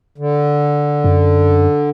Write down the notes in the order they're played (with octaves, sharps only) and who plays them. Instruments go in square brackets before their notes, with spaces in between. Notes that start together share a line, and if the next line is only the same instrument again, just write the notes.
[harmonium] D3
[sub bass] F#2